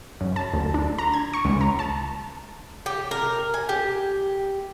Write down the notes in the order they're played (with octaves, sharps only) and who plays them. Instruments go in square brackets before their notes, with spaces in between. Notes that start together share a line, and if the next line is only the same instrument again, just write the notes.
[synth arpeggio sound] F#2
A5
D2
D4
A#5
G#6
C#6
C#2
A#5
A5
[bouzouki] G4
A#4
G#5
G4